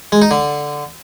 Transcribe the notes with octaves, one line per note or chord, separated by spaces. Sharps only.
G#3
D#4
D3